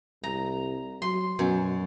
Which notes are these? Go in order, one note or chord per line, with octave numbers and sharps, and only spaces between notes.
C2 A#5
F#3 C6
F#2 B2